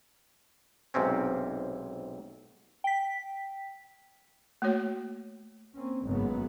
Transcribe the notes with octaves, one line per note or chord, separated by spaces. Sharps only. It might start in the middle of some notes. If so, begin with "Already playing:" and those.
B1 G#2 C3 C4 C#4
G5 B6
A3 A#3 F#4 C#5
A#3 C4 C#4
G#1 F#2 C#3 F#3 A#3 B3